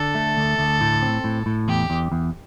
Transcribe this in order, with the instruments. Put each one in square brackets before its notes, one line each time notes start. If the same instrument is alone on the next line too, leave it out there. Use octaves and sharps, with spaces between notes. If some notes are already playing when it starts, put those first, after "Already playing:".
Already playing: [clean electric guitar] D3 [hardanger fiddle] A4
[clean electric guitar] A3
D2
D2
A2
C4
A2
A2
[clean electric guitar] E2 [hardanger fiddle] G4
[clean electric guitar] E2
E2